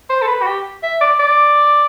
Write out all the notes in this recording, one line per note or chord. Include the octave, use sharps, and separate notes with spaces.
C5
A4
B4
F#4
G4
E5
D5
D5